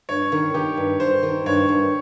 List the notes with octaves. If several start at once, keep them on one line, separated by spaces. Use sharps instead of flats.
G2 C#5
D#3
D#3 G4
G2
G2 C5
D#3
G2 C#5
G2